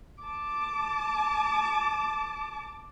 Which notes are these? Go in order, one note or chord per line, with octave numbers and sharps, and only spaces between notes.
A5 D6